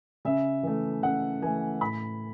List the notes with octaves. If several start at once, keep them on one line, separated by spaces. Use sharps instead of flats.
C#3 E5
E3 A3
C#3 F#5
E3 A3 G#5
A2 B5